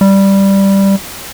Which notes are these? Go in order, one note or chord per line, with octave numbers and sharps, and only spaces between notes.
G3